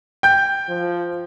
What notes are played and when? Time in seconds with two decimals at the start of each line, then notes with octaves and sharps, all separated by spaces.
0.23 G5 G6
0.68 F3